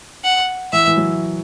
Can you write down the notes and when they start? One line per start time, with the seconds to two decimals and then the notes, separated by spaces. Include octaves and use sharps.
0.24 F#5
0.73 E3 E5
0.87 E3
0.97 F#3